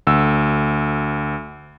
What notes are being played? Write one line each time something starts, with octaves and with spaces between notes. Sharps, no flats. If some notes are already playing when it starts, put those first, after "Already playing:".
D2 E6